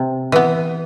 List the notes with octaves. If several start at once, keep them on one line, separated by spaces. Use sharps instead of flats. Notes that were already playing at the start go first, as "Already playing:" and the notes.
Already playing: C3
E3 B3